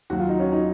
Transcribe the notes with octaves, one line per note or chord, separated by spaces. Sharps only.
D#2 D#3 F#3 F#4
F4
D#4
C#4 F4
D#4